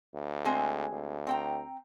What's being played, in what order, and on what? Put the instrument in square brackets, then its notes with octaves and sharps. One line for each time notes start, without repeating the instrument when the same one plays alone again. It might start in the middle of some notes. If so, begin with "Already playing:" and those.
[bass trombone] D2
[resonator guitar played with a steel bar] G#3 C4 G#4
[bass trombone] D2
[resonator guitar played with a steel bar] C4 G5 A#5